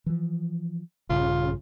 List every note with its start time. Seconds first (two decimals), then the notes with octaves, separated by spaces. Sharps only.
0.06 E3 F3
1.10 A#1 G2 C#3 F4